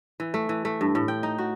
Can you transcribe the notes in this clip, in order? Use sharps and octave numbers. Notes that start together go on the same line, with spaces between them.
E3
A3
E3
A3
G2
A2
G5
D#4
F#4